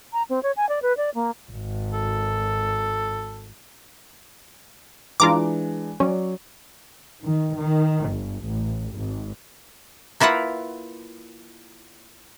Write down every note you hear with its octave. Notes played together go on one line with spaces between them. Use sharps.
A#5
C4
C#5
G#5
D5
B4
D5
A#3
G#1
A4
E3 G#3 D4 F4 A#5 D6
F#3 C#4 C#5 D5
D#3
D#3
G1
A1
G#1
A#3 E4 F4 B4 F#5